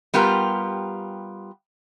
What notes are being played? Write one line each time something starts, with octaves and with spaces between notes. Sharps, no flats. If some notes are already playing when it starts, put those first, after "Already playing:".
G3 B3 F4 G4 A#4